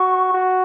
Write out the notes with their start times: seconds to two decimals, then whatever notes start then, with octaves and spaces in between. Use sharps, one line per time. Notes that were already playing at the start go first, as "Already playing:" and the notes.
Already playing: F#4 C#6
0.33 F#4